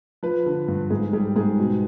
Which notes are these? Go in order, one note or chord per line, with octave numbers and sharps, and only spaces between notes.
F3 B4
D3
G2
G#2 G#4
G3 G#4
G#2 G#4
B2